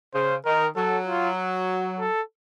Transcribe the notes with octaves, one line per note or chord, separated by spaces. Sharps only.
C#3 C5
D#3 A#4
F#3 A4
F4
A4